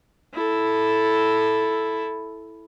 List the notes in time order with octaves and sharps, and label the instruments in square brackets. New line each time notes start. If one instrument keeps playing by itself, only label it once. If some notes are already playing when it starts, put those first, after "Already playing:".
[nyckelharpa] E4 A4